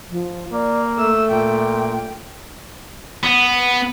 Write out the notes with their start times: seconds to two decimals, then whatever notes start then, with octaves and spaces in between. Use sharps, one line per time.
0.11 F3
0.52 A#3 D5
0.98 A3 E5 E6
1.31 A#2 G5
3.23 B3